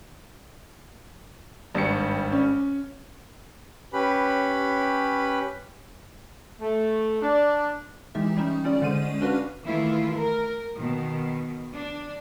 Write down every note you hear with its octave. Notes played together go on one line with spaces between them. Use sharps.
G#1 G2 G3 C#7
C#4
C#4 G4 B4 B5
A3
D4
E3 G#3 D#4 G4 E5
G3 C#4 D#4
G#3 C#4 F4 D5
D3 G#3 C#4 C5 D#7
C#4 D4 F#4 B4 F5
D#3 E3 A3 E4 F4
A#4
B2 D#3
D4